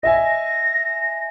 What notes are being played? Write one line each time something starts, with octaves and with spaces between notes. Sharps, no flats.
D#5 E5 G#5 A#6